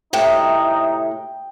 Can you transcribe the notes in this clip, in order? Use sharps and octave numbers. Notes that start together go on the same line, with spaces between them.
A2 C3 A3 D#4 G5